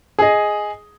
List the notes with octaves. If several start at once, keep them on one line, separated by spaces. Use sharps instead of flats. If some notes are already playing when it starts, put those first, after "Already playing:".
G#4 D#5